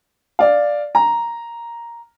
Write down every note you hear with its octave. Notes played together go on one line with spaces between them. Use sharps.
D5 F5
A#5